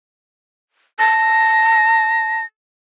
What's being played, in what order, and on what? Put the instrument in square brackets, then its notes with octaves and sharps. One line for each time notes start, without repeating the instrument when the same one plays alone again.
[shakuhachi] A5 [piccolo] A#6